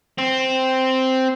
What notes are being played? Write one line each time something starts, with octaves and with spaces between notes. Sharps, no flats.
C4